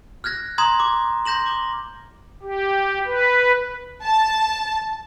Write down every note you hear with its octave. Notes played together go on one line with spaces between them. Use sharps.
F6 F#6 G#6 A#6
A#5 C6 D#6 G#6 E7
D6
C6 G6 A#6 E7 F#7
D6 G7
G4
B4
A5